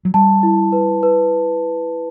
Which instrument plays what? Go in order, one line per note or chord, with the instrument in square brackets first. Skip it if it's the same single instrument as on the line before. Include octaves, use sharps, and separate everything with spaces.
[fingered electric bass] F#3
[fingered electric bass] G3 [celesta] A5
[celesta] E4
B4
B4